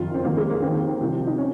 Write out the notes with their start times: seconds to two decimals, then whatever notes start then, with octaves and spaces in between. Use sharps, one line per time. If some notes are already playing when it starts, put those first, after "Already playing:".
Already playing: F#1 F2 D#3 F4
0.14 C4
0.24 F1 D#2 D#3 A#3
0.37 G#3
0.50 A#3
0.62 D#2 D#3 C4
1.01 C2 C3 F3
1.27 D#4
1.38 C#4